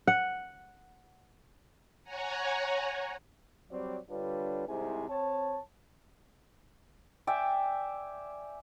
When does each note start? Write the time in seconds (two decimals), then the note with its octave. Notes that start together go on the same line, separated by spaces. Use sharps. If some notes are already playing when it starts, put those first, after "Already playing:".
0.08 F#5
2.04 C#5 F#5 G#5 A#5
3.71 F#3 G3 C4 D5
4.10 D3 G3 D4 F4 B4 C#5
4.68 C2 G#2 C3 E4 G#4 G#5
5.09 C4 C#5 A5
7.27 D5 E5 G5 G#5